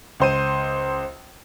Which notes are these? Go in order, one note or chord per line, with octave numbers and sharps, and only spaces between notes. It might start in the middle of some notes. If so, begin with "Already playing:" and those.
C#2 C5 D#7